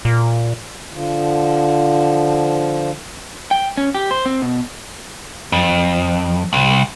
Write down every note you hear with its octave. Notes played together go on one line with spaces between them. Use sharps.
A#2
D3 F3
G5
C#4
G4
C5
C4
B2
F2
C2